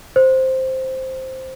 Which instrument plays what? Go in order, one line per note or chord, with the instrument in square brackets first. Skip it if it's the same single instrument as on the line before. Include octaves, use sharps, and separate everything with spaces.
[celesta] C5